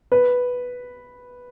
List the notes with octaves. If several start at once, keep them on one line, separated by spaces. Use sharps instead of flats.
B4